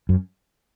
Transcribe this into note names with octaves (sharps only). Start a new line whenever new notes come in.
F#2